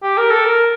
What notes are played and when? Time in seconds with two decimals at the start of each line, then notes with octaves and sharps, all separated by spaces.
0.03 G4
0.18 A#4
0.31 A4
0.45 A#4